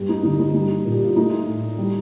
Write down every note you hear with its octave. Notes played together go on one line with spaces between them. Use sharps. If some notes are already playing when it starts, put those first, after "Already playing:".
Already playing: G2 G3 G4
D#4
D3 D#4
D#4
G3 D#4
A#2
G4
F4
A3 D#4
A2
G3